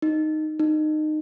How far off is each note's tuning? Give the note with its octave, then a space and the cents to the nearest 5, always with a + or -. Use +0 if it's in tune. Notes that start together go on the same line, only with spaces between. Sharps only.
D#4 -5
D#4 -20